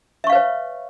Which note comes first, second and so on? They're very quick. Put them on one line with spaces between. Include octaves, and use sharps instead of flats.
E5 C#6 F5 B4 C#5